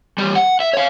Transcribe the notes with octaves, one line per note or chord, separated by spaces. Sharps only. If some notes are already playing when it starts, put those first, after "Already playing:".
E3 G3
F#5
E5
C#5 F5